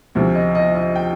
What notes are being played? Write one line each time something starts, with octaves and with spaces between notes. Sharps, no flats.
D2 C3 F3
D#5
D#5
D#5
G5